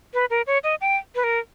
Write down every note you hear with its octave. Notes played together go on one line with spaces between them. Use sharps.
B4
A#4
C#5
D#5
G5
B4
A#4